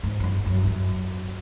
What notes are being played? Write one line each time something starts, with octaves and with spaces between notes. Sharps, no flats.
G#2
F#2
G2
F#2
G2
F#2